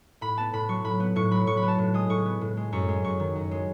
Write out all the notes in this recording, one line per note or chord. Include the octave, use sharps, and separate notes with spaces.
A2 B5
B3 A5
A2 B5
F#3 C#6
A2 B5
B3
A2 C#6
F#3 B5
A2 C#6
B5
B3
A5
A2
G#3 D#6
A2 C#6
B3
A2
G#3
F#2 C#6
G#3
F#2 C#6
D#3
F#2
G#3